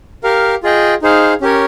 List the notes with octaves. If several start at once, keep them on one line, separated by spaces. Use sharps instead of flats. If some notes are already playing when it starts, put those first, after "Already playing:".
G4 A#4 F5
F4 G#4 D#5 G5
D#4 G#4 C5 F5
C#4 G4 A#4 C#5